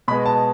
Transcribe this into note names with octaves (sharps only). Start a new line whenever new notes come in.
B2 G#3 B3 B5
A5